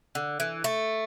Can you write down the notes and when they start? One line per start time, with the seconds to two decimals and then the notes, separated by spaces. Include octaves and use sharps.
0.15 D3
0.40 E3
0.64 A3